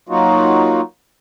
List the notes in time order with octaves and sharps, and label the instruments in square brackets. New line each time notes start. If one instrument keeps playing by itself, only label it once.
[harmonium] F#3 A#3 D#4 F4 F#4